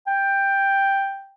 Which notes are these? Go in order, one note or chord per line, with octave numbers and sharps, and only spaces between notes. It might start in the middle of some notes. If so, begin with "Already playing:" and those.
G5